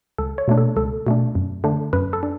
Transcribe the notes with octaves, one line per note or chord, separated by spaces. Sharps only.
C#2 A4
C#5
B2 A3 D4
A4
C#2 A4
B2 A3 D4
F#2
D3 A3 D4
F#2 B4
A4
D4